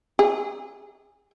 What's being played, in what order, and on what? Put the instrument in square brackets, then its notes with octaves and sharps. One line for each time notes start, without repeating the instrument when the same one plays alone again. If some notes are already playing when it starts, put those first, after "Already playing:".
[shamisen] G#4